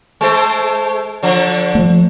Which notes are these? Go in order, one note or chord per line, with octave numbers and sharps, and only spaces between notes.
G#3 A3 C5
D3 F3
F3 A3